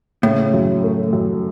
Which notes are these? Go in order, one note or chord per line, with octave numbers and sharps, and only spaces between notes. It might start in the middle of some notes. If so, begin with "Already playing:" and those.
A2 C#3
F#2
A3
F#2